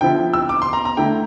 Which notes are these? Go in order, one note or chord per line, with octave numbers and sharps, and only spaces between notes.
D3 F3 C4 E4 G5
E6
D6
C6
A#5
A#5
D3 A3 E4 G5